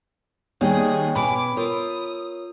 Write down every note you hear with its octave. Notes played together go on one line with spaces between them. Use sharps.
D#2 G3 G#4 C#5 D#5 G5
B2 C#4 G#5 B5 D6
F4 A#4 C#5 D#6